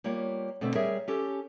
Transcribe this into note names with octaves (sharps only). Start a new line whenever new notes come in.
G3 A#3 B3 F4 C#5
B2 D3 A3 C4
G3 G#4 A#4 C#5 E5
C#4 G4 A4